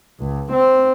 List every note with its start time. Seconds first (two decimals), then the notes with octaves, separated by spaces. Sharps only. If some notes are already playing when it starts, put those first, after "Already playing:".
0.20 C#2
0.52 C4